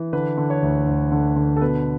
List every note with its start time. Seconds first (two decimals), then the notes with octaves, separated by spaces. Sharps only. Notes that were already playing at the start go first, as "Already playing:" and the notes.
Already playing: E3
0.13 D3 B4
0.38 D3
0.50 C#5
0.62 D2
0.87 D2
1.12 D3
1.36 D3
1.57 A4
1.61 B2 B4